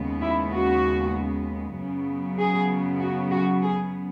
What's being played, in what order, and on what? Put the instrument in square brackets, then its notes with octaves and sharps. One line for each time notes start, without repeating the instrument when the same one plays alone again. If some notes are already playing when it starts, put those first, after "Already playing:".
Already playing: [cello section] D#2 C#3 G#3 B3
E4
F#4
F#2 C#3 F#3 B3
G#4
F#4
F#4
G#4